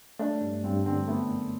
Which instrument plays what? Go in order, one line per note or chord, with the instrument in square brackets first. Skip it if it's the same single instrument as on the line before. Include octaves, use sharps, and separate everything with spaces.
[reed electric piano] A3 [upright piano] D4
[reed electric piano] G2
[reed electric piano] G2 [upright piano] C4
[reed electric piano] D3 [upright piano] C4
[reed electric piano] A3 [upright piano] B3
[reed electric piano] F#2